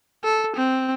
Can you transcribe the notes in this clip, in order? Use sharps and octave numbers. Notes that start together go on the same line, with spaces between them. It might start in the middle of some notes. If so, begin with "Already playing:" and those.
A4
C4